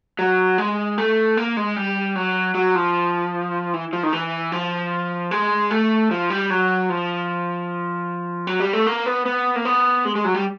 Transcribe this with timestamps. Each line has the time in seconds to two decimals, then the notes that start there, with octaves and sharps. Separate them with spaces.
0.19 F#3
0.58 G#3
0.98 A3
1.37 A#3
1.57 G#3
1.76 G3
2.16 F#3
2.55 F#3
2.75 F3
3.74 E3
3.93 F3
4.03 D#3
4.13 E3
4.52 F3
5.31 G#3
5.71 A3
6.11 F3
6.30 G3
6.50 F#3
6.89 F3
8.47 F#3
8.60 G3
8.73 A3
8.86 A#3
9.06 B3
9.25 B3
9.56 A#3
9.65 B3
10.05 G#3
10.15 G#3
10.24 F#3
10.35 G3